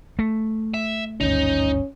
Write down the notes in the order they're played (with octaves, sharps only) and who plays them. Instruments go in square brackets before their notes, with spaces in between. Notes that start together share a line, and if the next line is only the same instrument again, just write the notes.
[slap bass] A3
[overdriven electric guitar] E5
[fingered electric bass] G#1 D2 G2 [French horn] C#4 [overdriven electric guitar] D#4